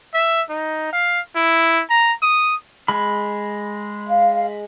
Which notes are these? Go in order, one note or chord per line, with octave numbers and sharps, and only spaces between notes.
E5
D#4
F5
E4
A#5
D#6
G#3 B5
F5